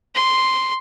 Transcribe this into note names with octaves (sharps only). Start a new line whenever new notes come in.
C6